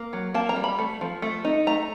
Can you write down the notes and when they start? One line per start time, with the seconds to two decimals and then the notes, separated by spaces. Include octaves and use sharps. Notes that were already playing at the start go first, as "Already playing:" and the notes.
Already playing: A#3
0.13 F#3
0.34 A#3 A5
0.49 A#5
0.56 G3
0.64 B5
0.79 A3
1.01 F3
1.22 A3
1.45 D#4
1.67 A3 A#5